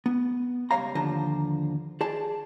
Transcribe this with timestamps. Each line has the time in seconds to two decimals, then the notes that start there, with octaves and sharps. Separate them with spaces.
0.06 B3
0.71 C#2 A#2 G3 C#5 F5 A#5
0.95 D#2 D3 F3 A#5
2.01 G#4 D5 A5